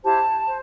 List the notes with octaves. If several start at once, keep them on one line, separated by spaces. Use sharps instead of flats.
E4 G4 C5 A5
C5